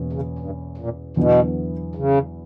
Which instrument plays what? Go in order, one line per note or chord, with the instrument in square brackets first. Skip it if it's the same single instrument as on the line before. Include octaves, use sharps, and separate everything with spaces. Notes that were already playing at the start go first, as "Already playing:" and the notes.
Already playing: [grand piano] E2 B2 A#3 C#4 E4
[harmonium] C#3
G2
A#2
[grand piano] E2 D3 F#3 B3 E4 [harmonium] B2
[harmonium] C#3